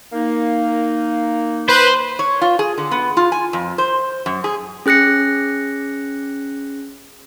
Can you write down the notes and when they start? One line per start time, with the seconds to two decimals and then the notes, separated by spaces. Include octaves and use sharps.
0.12 A#3 D#4
1.69 B4 C5
2.19 C#5
2.41 F4
2.59 G#4
2.78 D3
2.91 B3
3.17 F4
3.32 G#5
3.53 F2
3.78 C5
4.26 F#2
4.44 G#4
4.86 C#4 G#4 F#6 A#6 C#7